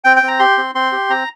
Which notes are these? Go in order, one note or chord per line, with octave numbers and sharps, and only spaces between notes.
C4 G5
G5
C4 A#5
G4 C6
C4
C4 C6
G4
C4 A#5